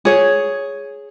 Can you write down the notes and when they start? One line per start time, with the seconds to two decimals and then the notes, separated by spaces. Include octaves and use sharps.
0.05 G#4 C#5